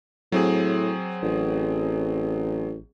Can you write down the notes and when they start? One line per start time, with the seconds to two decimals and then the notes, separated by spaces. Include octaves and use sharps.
0.32 A2 F#3 C4 G#4
1.22 A1